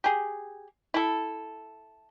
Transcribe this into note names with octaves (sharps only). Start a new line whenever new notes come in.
G4 G#4
E4 A4